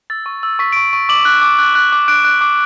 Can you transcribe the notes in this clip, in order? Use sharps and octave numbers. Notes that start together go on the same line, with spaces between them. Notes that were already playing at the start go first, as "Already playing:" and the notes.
E6 A6
C#6
E6
C#6 B6
C#6 D7
C#6
D6 F#7
F#6
D6
F#6
F#6
D6
F#6 D7
F#6
D6